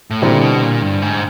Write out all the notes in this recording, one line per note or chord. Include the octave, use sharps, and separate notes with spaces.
A2
A#2 D3 G3 C4 E4
B2
A#2
G2
G#2